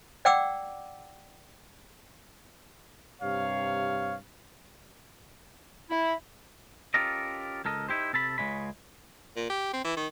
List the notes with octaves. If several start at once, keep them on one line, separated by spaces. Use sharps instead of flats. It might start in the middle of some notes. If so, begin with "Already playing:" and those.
D5 F#5 G5 D6 E6
G2 C3 C#5 F5
E4
C#4 F4 G4 A4 A#4 D#5
C#2 A4 A#4 D#5
D#4 E4 G4 C5
C3 A4 A5 B5
C#2 A2 C#3 G#3 B5
A#2
G4
C4
E3
D#3